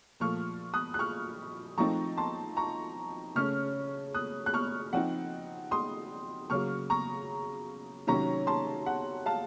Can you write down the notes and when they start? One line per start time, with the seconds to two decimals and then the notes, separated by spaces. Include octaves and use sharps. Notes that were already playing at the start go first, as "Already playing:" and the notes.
0.20 A#2 F3 A3 C#6 F6
0.74 D#6 F#6
0.94 F#6
0.99 C#6 F6
1.78 F3 A3 C4 D#4 A#5 C#6
2.17 A5 C6
2.57 A#5 C#6
3.35 C#3 A3 C#4 C#6 F6
4.14 D#6 F#6
4.46 F#6
4.54 C#6 F6
4.93 F3 C4 D#4 F#5
5.71 C6 D#6
6.50 C#3 F#3 A#3 C#6 F6
6.90 A#5 C#6
8.07 C3 D#3 F#3 A#3 C#4 A#5 C#6
8.47 A5 C6
8.86 F#5
9.26 F5 A5